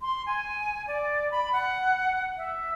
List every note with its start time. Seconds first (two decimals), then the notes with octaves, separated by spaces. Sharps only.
0.01 C6
0.26 G#5
0.87 D5
1.32 B5
1.53 F#5
2.38 E5